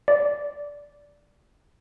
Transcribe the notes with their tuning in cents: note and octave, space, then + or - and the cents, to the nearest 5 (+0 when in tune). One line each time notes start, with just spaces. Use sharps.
D5 -10